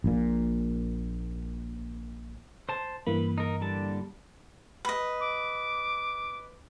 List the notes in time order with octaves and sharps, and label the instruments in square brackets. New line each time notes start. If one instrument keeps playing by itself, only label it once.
[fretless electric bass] A#1 A#2
[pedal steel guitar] C5 A5
[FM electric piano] G2 E3 A#3 [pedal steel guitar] B5
[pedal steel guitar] D#4 A#4
D3 G3 A5
[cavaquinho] B4 D#5
[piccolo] D6